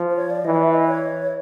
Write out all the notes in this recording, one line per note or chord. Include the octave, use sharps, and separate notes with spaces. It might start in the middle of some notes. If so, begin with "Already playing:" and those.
Already playing: F3
C5
C#5
D5
E3 D#5
D5
E5
D#5
C#5